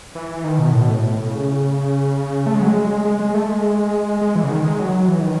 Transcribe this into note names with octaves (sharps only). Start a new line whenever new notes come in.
E3
D#3
B2
A2
B2
A2
C#3
A3
G#3
F#3
G#3
G#3
G#3
A3
G#3
G#3
E3
C#3
D#3
G#3
F#3
E3
D#3